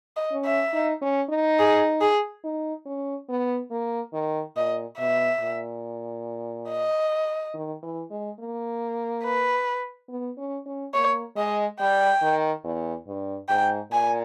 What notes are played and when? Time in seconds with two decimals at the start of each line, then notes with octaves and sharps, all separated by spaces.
0.16 D#5
0.31 C#4
0.46 E5
0.73 D#4
1.02 C#4
1.30 D#4
1.59 G#4
2.01 G#4
2.44 D#4
2.86 C#4
3.29 B3
3.71 A#3
4.13 D#3
4.56 A#2 D#5
4.99 B2 E5
5.41 A#2
6.69 D#5
7.54 D#3
7.83 E3
8.11 G#3
8.40 A#3
9.24 B4
10.09 B3
10.38 C#4
10.66 C#4
10.94 A#3 C#5
11.36 G#3 D#5
11.80 G3 G5
12.22 D#3
12.64 E2
13.07 G2
13.49 G#2 G5
13.92 A#2 G#5